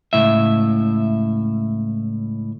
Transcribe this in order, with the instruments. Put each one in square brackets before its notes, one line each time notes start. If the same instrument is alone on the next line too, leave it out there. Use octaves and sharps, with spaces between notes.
[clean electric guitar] C#2 A2 E5